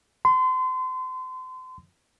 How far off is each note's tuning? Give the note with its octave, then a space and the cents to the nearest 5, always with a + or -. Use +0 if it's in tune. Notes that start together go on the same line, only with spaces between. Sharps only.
C6 -35